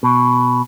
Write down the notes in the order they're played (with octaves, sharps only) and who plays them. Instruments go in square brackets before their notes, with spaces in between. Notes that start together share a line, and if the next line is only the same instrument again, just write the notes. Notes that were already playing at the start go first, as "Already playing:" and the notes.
[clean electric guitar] B2